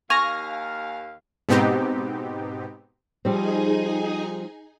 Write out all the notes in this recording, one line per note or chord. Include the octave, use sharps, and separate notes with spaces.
D#2 F5 G#5 C#6 F6 A#6
G#2 B2 B3 C4 D#4 G4
F3 G3 C4 D#4 G#4 G#5